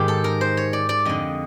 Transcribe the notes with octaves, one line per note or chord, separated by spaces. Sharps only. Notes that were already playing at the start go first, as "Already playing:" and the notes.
Already playing: G#2 D#3 G4
A4
A#4
C5
C#5
D5
D5
F2 D3 D#5